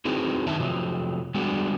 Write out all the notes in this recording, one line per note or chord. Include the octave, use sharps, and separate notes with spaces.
C4 D#4 E4 F#4 G#4 B4
F#2 D#3 D#4 B4 E5 A5
C3 F3 F#3
G3 G#3 B3 D4 F#4